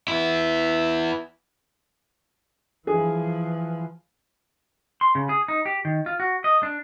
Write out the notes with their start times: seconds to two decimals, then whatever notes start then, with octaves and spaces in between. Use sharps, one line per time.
0.08 B3 E4
2.87 E3 F3 G#4
5.01 C6
5.15 C#3
5.29 G#4
5.48 D#4
5.66 G4
5.85 D#3
6.06 F4
6.20 F#4
6.44 D#5
6.63 D4